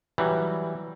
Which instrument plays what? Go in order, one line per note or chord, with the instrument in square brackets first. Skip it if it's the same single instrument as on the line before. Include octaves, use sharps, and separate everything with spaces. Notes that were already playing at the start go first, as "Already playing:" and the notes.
[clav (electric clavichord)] E3 F#3 G3